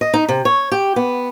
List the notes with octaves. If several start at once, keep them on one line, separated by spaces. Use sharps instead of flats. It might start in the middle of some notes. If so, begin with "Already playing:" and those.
D#5
D#4
C3
C#5
G4
B3